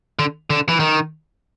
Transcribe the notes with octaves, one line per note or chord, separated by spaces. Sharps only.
D3
D3
E3
D#3